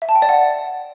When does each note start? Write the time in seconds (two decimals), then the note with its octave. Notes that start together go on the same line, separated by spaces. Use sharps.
0.02 E5
0.09 A5
0.15 G5
0.22 D5
0.29 F#5